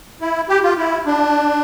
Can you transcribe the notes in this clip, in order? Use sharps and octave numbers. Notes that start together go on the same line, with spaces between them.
E4
G4
F4
E4
D4